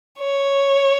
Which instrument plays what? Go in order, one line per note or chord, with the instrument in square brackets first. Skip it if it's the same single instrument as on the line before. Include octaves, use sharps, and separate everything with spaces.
[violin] C#5